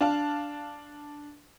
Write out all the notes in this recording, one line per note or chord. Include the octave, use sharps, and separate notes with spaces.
D4 F5 A5